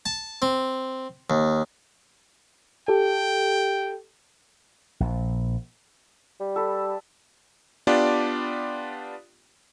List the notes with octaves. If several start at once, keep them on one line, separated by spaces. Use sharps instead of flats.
A5
C4
D#2
G4 A4 G5
A#1
G3
A4 B4
B3 D4 F4 G4 D5